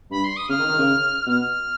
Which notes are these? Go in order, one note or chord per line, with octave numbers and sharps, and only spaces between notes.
G2 B5
C6
D#6
C#3 F6
D#3
D#3
C#3
B2 F6